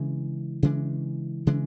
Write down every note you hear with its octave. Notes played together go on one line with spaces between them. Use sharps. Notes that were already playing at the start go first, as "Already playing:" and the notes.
Already playing: C#3 E3 G#3 D4
C#3 E3 G#3 D4
C#3 E3 G#3 D4